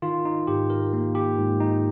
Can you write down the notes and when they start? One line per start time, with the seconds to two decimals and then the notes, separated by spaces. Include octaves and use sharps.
0.02 D#3 F4
0.25 D#4
0.47 G#2 G4
0.70 A#4
0.93 A#3
1.15 G4
1.38 G#2
1.60 D#4